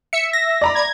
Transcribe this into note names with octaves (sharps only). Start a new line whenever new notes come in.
E5 C#7
A#6
D5 A#5 B5
G#6